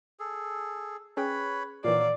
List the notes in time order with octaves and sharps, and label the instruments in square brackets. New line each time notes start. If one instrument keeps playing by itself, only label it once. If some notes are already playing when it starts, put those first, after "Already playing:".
[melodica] G#4 A4
[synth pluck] C#4 G#4 G5 [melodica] B4 C#5 B5
[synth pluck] A#2 D#3 E3 [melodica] F#3 F5 [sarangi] D5